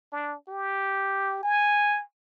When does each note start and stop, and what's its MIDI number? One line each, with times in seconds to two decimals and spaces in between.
0.13 0.36 62
0.48 1.41 67
1.43 2.02 80